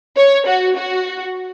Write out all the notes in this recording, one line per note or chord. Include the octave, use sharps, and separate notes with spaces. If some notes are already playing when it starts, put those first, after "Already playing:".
C#5
F#4
F#4